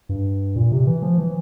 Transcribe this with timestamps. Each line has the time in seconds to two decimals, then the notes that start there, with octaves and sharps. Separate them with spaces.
0.09 G2
0.56 A#2
0.72 C3
0.87 E3
1.02 F3
1.18 E3